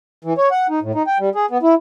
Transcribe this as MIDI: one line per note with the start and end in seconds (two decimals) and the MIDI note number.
0.25 0.33 52
0.38 0.49 73
0.51 0.67 78
0.70 0.79 63
0.82 0.92 45
0.95 1.03 63
1.07 1.18 79
1.20 1.30 55
1.35 1.46 68
1.50 1.58 59
1.63 1.75 64